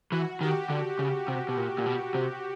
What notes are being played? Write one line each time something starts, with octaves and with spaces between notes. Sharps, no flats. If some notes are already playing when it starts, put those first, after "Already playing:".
E3 F#4
D#3 G4
D3
C#3
C3
B2
A#2
A#2
B2
C3